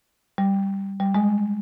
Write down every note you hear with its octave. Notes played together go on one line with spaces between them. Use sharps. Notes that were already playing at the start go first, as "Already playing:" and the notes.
G3
G3
G#3